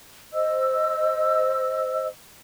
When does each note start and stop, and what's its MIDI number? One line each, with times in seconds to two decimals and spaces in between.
0.33 2.08 72
0.33 2.08 75
0.33 2.08 88